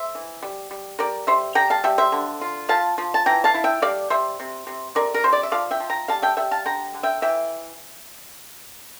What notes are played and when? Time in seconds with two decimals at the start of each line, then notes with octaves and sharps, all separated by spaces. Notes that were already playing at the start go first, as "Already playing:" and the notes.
Already playing: C5 E5
0.15 E3
0.43 G3
0.71 G3
0.99 G3 A#4 D5
1.27 G3 C5 E5
1.55 G3 G5 A#5
1.70 F5 A5
1.84 G3 E5 G5
1.98 C5 E5
2.12 D3
2.41 F4
2.69 F3 F5 A5
2.98 F3
3.14 A5
3.26 E3 G5 A#5
3.44 F5 A5
3.54 E4
3.64 E5 G5
3.82 G3 D5 F5
4.10 G3 C5 E5
4.40 C3
4.67 C3
4.95 C3 A#4 D5
5.14 A#4
5.24 C3 C5
5.33 D5
5.43 E5
5.52 F3 D5 F5
5.71 E5 G5
5.80 F3
5.90 G5 A#5
6.08 G3 F5 A5
6.22 E5 G5
6.37 G3 E5 G5
6.51 F5 A5
6.66 D3 G5 A#5
6.94 D3
7.03 E5 G5
7.22 E3 E5 G5